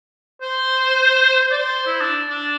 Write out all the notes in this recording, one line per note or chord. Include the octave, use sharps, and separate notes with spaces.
C5
D5
C5
E4
D4
D4